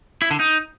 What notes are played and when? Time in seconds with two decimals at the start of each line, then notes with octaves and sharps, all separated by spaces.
0.22 E4
0.31 D3
0.40 D#4